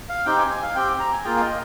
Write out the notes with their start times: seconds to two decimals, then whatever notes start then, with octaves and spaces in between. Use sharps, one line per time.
0.09 F5
0.26 C4 D#4 G4 G5
0.38 G#5
0.51 G#5
0.63 F5
0.75 C4 G4 G5
1.00 A#5
1.12 G#5
1.24 A#3 F4 G#4 G5
1.37 F5
1.40 D#5